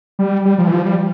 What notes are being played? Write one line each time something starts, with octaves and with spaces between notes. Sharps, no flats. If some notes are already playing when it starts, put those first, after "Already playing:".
G3
G3
F3
E3
F3
G3